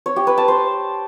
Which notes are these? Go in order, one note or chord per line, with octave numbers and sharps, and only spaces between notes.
C#5
G4
B4
A5
C5